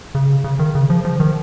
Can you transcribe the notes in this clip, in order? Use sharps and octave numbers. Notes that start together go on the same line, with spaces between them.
C#3
C#3
D#3
C#3
F3
F3
D#3